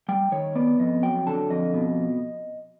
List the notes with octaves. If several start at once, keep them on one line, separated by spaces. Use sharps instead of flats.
G3 G5
D#3 C#5
B3 D5
F2 D#5
F#3 G5
D3 A5
F2 D#5
B2